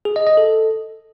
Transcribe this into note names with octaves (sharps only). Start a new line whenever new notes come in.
G#4
D#5
D#5
A4